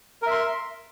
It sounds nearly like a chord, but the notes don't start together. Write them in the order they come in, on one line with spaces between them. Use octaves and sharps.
A#4 E5 C6